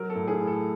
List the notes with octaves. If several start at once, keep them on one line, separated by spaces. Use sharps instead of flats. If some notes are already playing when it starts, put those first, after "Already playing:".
Already playing: F#3 A#4
A4
A2
G#4
A2
A4